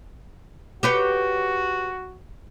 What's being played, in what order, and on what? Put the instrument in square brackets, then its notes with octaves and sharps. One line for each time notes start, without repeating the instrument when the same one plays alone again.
[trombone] F#4 [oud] G4 B4 C#5